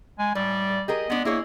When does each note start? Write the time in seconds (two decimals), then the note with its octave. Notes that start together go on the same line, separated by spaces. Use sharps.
0.19 G#3 G#5
0.35 A2 G3 D5
0.88 G4 G#4 A#4 D#5
1.10 G#3 B3 D4
1.25 A#3 E4 G#4 C#5